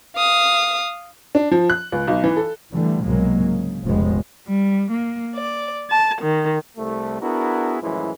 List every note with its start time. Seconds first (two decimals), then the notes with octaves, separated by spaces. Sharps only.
0.16 F5 D#6
1.35 D4
1.51 F3
1.70 F#6
1.92 C#2
2.07 B1
2.24 E3
2.37 A4
2.72 D3 E3 G3 A3
3.04 C2 G#2 B2 F#3 G#3 A#3
3.39 C#3
3.85 F1 A#1 C#3 F3 G#3 B3
4.48 G3
4.92 A#3
5.35 D5
5.90 A5
6.22 D#3
6.78 C2 A3
7.22 B3 D4 E4 F#4 G#4 A#4
7.82 F#2 A2 E3 F3 G#3 E4